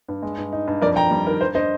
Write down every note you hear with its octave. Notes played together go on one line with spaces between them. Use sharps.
G2
G#3
G2
D#4
G2
F2 A#4 D5
F2 G5 A#5
G3
D#3 A#4
G2 C5
D4 C5 D#5